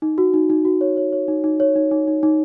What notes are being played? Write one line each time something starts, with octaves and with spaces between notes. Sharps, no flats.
D#4
F#4
D#4
D#4
F#4
C#5
C#5
C#5
D#4
D#4
C#5
D#4
D#4
D#4
D#4